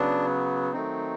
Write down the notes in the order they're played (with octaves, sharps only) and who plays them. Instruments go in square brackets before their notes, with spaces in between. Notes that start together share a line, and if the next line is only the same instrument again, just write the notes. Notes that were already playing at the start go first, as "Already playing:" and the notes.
Already playing: [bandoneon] C#3 F#3 B3 D4
D#3 F#3 A3 C4 D#4